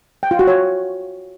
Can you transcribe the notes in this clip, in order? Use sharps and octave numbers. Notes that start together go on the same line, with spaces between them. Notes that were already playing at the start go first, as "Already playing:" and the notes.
G5
F4
F#4
C#5